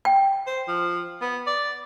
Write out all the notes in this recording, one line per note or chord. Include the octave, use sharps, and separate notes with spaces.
G5
C5
F3
B3
D5